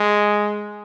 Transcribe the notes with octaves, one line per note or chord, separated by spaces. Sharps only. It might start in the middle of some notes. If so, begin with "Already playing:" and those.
Already playing: G#3